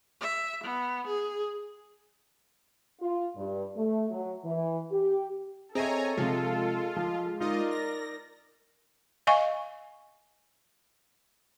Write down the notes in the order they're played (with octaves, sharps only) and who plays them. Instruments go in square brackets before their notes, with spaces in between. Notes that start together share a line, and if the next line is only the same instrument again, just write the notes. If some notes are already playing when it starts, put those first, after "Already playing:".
[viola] E5
B3
G#4
[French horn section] F4
G2
A3
F#3
E3
G4
[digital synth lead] C4 [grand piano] G#4 D#5 E5 [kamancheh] A4 [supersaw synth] C#5 G#5 A#5
[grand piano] C3 F3 [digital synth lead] G#3 [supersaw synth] F4
[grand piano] F3
[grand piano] D#4 [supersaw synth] F4 D#5 [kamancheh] A#4 D5
[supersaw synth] A#6
[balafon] D#5 F5 G#5 C#6